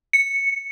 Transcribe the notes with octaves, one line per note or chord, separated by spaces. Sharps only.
C#7